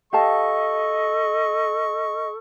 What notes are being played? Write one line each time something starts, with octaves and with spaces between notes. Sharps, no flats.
G4 A4 D#5 F5 A5 C#6